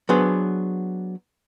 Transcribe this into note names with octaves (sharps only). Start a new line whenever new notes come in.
F#3 B3 D4 G#4 B4 C5